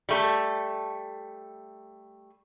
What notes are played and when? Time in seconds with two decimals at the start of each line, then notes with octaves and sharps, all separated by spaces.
0.09 G3 A3 A4